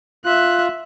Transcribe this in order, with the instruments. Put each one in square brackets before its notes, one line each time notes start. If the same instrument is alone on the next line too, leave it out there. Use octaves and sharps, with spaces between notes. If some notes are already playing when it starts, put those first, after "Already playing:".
[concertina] F4 [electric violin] E5 F#6